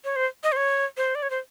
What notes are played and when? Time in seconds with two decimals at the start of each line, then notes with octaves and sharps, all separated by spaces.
0.04 C#5
0.16 C5
0.43 D#5
0.52 C5
0.57 C#5
0.97 C5
1.15 D5
1.23 C#5
1.31 C5